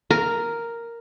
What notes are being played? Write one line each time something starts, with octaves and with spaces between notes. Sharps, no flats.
A#4